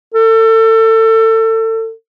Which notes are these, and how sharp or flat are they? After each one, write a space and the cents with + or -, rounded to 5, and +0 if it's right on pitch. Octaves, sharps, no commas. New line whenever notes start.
A4 +30